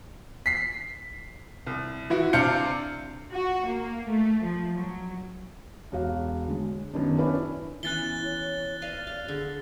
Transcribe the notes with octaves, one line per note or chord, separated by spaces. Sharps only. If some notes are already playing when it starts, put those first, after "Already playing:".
B6 C7
C2
E3 E4 F#4
C3 D4 F5 G6 C#7
F#4
A#3
A3
F3
F#3
E1 F#4 F5
D3 G#3
F#2 D#3 B3 D4
C#4 D4 E4 B4 C#5 D5
E3 B3 C#4 E4 F#6 A6 G7
C#5
B4 D5 D#5 F5
F5
D3 G#4